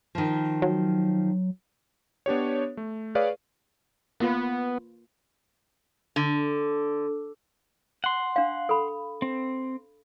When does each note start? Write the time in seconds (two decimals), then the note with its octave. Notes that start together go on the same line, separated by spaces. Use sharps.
0.15 D#3 F3
0.62 F#3
2.26 B3 D4 G4 C#5
2.77 A3
3.15 G#4 B4 C#5 D5 F5
4.20 A#3 B3 F4 B4
6.16 D3
8.04 F#5 C6
8.36 D4 F5
8.69 A4 B5
9.22 C4